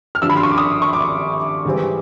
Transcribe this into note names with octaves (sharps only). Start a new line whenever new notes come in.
F6
G#1 G2 D3 F3 E6
B5
C6
C#6
D6
D#6
C#6
D6
G#2 E3 G3 C4